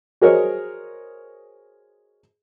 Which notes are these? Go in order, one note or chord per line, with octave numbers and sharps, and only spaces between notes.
F#4 G#4 A#4 C5 C#5 D#5